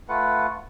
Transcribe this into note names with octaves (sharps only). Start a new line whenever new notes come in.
A3 F4 B4 F#5